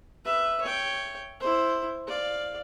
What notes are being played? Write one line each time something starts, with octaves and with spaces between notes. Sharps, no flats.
B4 E5
C#5 G5
E4 C5
D5 F5